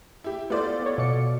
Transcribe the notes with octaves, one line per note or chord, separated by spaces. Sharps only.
E4 G4
A3 B3 E4 F4 C5 D5
B3 C#5
B2 D6 C#7